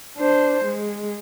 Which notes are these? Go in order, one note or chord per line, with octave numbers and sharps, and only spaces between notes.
D4 C5
G#3